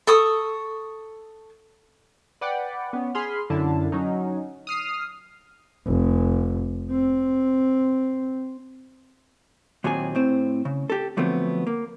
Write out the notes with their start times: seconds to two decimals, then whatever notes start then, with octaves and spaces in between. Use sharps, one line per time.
0.07 A4 C#6 D#6
2.41 B4 D5 F#5 G5
2.93 B3 C#4
3.15 G#4 B5 C6 F6
3.50 F#2 D3 E4 A5
3.92 F#3 C#4 D#4
4.67 D#6 F6 C7
5.86 F1
6.90 C4
9.84 D#2 A#2 F#3 C4 G#4 G#5
10.15 A2 C4 C5
10.65 C#3
10.90 G4 A4
11.17 D3 F3 F#3 A3 B3 C4
11.67 A#3